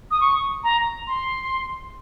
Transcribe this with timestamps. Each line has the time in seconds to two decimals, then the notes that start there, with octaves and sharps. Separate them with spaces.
0.11 D#6
0.21 C#6
0.64 A#5
1.07 C6